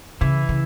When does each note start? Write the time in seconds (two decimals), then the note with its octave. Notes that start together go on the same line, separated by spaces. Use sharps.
0.21 C#3 E3 E4
0.49 C#3